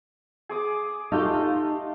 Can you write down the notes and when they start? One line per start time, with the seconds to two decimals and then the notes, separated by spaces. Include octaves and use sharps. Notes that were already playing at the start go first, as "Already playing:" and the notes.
0.49 G#4 D6 D#6
1.12 A3 D#4 F4 G4